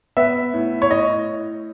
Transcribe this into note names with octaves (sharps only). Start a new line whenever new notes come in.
B3 E5
A2
C#5
A2 D#5